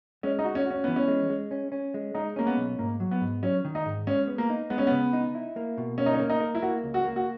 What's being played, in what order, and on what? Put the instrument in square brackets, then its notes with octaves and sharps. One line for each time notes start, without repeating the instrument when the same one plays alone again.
[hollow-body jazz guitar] G#3 [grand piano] C#4
[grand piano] D#4
[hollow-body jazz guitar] F#4
[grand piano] C#4
[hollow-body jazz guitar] F#4
[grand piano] C#4
[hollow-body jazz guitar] E3 [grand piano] B3
[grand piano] C#4
[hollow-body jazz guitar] G#3
G#3
C#4
C#4
G#3
[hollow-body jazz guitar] G#3 [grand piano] D#4
[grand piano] A#3 [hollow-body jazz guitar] C#4
[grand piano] B3
[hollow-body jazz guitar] B1
[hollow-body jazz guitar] G#2 [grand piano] A#3
[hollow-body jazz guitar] F#3
[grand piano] B3
[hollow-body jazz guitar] G#2
[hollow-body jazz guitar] F#3 [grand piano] C#4
[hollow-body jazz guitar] D#3
[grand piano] D#4
[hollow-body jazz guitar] G#2
[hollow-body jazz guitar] G#3 [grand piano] C#4
[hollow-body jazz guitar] B3
[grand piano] A#3
[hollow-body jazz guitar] D#4
[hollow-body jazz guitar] G#3 [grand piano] B3
[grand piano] C#4
[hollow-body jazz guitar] C#3 [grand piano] B3
[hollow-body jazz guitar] D#4
E4
A#3
B2
[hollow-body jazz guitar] A#3 [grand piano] C#4
[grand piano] D#4
C#4
[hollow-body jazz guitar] A#3
[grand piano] D#4
[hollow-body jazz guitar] A#4
[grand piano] E4
[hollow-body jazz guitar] A#3 [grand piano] F#4
[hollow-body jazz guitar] C#2
[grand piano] F#4
[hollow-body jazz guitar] A#3
[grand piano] F#4